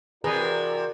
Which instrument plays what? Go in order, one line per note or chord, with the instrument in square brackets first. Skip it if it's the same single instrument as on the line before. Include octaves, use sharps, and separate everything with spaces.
[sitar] C3 E3 [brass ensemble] F#4 A#4 D5 [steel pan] G#4 B4 A#5